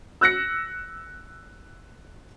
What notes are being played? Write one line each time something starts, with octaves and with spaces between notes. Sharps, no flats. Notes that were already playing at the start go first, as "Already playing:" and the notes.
E6 F#6 A#6 C#7